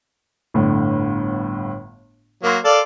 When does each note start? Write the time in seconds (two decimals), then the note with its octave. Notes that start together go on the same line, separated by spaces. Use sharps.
0.54 G1 A2 D3
2.44 F#3 A#3 A#4 C6
2.65 A4 D5 F5